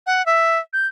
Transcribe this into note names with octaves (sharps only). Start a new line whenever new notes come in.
F#5
E5
G6